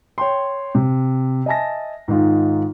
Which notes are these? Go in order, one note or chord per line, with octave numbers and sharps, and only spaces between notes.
C#5 G5 C6
C3
D#5 E5 G#5 A5 A#6
G#2 D#3 D#4 F4